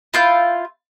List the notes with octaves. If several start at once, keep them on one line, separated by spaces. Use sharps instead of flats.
E4 F4 G6